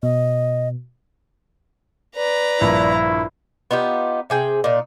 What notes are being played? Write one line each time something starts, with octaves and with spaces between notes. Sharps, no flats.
B2 D#5
B4 D5 A#5
A#1 G2 E4
B3 D#4 F4 G4
C3 G#4 G5
A#2 D#4